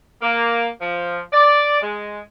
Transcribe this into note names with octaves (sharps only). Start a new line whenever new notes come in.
A#3
F3
D5
G#3